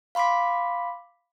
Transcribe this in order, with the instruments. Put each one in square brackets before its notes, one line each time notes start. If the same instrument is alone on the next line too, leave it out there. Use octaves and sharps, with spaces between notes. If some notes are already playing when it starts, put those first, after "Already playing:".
[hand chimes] F5 B5 C6 D6 B6